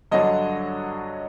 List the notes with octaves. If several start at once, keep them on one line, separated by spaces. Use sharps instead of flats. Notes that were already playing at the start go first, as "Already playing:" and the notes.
G2 D3 F#3 D#5